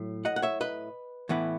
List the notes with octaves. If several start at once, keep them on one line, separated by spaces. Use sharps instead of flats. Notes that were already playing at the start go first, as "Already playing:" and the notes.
Already playing: A2 F#3
D#5 F#5
F#5
C#5 E5
B4 D#5
A2 E3 B3 E4